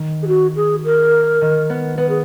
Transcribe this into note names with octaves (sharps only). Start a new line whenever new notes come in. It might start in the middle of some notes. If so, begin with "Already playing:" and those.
Already playing: D#3
G#4
F#4
G#4
A#4
D#3
B3
B3 B4
G#4